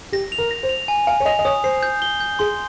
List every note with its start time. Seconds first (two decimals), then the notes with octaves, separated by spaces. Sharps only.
0.12 G4 A#6
0.32 F7
0.38 A#4
0.51 A#6
0.63 C5
0.69 F7
0.88 G#5
1.07 F5 G#5
1.20 C#5
1.26 D#5 F7
1.39 D#5
1.45 C#5 D#6
1.64 C5 C7
1.83 G6
2.02 G7
2.20 G6
2.39 G#4 C6